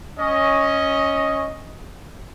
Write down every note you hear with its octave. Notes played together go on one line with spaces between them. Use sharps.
C#4 D#5